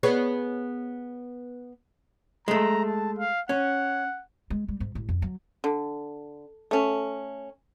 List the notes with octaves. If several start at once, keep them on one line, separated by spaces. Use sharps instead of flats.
B3 G#4 C#5
G#3 A3 A#5
A5
F5
C#4 F#5
G#3
G3
G#2
A1
F2
F#3
D3
A3 C#4